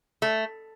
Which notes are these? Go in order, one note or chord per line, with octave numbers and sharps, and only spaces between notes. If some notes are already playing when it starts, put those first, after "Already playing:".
A3